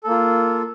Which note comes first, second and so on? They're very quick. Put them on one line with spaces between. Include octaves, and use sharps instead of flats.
A4 A#3 F4